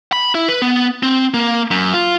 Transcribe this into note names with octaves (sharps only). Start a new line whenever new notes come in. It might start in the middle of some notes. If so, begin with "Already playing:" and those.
B5
E4
B4
B3
C4
A#3
F#2
F4